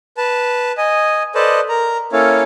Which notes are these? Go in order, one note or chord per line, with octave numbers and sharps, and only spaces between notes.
B4 A5
D#5 G#5
A4 B4 C5 D5 D#5 A5
A#4 A#5
A#3 C#4 E4 A4 C#5 F5